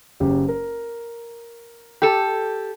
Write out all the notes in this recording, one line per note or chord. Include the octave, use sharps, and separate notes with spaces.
F#1 F#2 G4
A#4
G4 A4